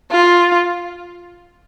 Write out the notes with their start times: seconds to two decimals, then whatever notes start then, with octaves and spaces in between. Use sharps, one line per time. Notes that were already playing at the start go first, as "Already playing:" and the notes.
0.11 F4